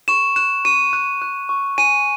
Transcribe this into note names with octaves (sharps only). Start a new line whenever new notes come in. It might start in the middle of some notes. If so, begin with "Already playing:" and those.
C#6 E7
F#6 E7
C#6 D#7
F#6
F#6
C#6
G#5 D#7